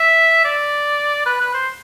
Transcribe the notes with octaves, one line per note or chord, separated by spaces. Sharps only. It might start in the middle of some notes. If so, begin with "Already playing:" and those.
Already playing: E5
D5
B4
B4
C5